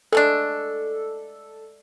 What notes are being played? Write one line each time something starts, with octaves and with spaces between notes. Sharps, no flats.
G#3 A3 D4 A4